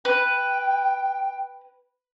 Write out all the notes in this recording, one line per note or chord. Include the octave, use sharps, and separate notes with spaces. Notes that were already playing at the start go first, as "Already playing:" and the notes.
B4 G5